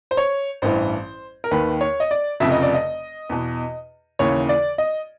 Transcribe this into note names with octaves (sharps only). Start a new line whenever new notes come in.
C5
C#5
A1 G2 E3 C5
A#4
D#2 D#3 B4
C#5
D#5
D5
F1 F2 C#3 E5
D#5
D5
D#5
E2 B2
D#2 C#3 E3 C#5
D5
D#5